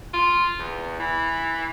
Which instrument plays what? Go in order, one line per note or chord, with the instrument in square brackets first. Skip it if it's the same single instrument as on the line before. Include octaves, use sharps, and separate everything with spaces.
[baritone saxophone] F4
E2
E3